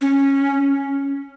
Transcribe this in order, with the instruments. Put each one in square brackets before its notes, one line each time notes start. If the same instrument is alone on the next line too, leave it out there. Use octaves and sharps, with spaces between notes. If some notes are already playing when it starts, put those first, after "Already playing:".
[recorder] C#4